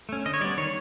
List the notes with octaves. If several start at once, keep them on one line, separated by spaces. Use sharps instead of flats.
A3 C#4
D3 D#5
C#5
G3 B3 D5
D#3 C#5